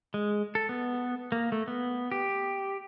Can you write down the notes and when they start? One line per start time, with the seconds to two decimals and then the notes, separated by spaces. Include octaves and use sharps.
0.14 G#3
0.55 A4
0.69 B3
1.32 A#3
1.52 A3
1.68 B3
2.12 G4